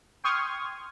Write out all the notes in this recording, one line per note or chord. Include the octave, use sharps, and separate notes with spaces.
G5 C6 C#6 D#6 F6 G#6